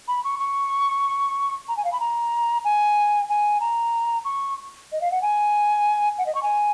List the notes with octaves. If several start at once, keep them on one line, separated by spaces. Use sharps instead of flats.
B5
C#6
C#6
A#5
G#5
F5
B5
A#5
G#5
G#5
A#5
C#6
D#5
F5
F#5
G#5
F#5
D#5
C#6
G#5